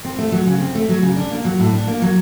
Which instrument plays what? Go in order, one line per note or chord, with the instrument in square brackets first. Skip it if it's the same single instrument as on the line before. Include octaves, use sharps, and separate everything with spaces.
[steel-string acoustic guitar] C4
A3
F#3
C#3
C4
A3
F#3
C#3
D4
A#3
F#3
A2
D4
A#3
F#3